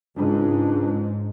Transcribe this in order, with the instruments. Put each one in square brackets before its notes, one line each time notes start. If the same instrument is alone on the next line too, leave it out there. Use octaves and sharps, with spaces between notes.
[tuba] C#2 [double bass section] G#2 [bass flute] D4